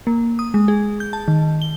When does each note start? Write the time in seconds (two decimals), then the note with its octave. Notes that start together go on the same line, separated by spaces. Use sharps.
0.07 A#3
0.39 D#6
0.54 G#3
0.68 G#4
1.00 G6
1.13 A5
1.28 D#3
1.62 G7